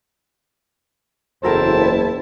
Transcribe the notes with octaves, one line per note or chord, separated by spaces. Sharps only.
F#1 E2 E4 A4 A#4 C5 G5 A5